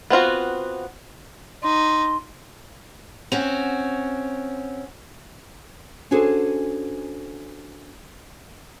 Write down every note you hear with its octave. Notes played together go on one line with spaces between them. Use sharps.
B3 C4 F4 F#4
D#4 C6
C4 C#4 F#4
C#4 D4 F#4 G#4 A4 C5